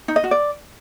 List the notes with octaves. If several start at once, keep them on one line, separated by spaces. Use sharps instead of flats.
D#4
D#5
F#4
D5